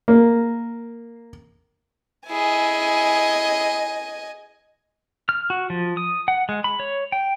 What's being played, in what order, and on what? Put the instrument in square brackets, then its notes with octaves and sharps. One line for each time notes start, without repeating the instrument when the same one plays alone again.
[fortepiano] A#3
[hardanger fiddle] E4 G#4 [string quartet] D#5 G#5
[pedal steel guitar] F6
F#4
F3
D#6
F#5
G#3
B5
C#5
G5